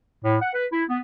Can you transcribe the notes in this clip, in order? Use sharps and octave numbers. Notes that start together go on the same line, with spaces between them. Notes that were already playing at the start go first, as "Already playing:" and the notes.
A2
F#5
B4
E4
B3